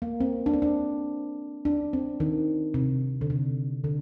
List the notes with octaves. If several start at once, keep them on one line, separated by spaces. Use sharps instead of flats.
A#3
C4
D4
C4
D4
D4
C4
D#3
C3
D3
C3
D3